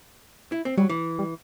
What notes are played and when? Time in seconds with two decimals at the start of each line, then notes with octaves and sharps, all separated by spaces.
0.52 E4
0.65 C4
0.77 F#3 G3
0.89 E3
1.19 G3